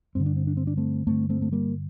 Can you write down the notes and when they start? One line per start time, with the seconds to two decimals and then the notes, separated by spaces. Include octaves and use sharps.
0.15 G2 D3 C4
0.26 D4
0.37 C4
0.47 D4
0.57 C4
0.67 D4
0.77 A3 C4
1.07 G2 D3 A3 C4
1.30 A3 C4
1.42 A3
1.52 G3 A#3